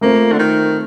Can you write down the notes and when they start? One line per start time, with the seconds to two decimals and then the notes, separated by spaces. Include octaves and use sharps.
0.01 A3 A#3 C4 F4
0.32 D3
0.39 D#3